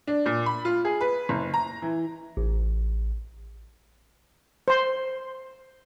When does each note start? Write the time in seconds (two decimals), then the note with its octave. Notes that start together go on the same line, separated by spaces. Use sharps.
0.07 D4
0.26 A#2
0.46 B5
0.65 F4
0.85 G#4
1.01 B4
1.29 F#1
1.54 A#5
1.82 E3
2.37 A1
4.68 C5 C6